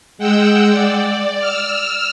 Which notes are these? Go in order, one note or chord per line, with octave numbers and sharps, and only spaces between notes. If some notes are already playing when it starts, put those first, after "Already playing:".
G#3 F#5 G5 E6
D5
E6 F6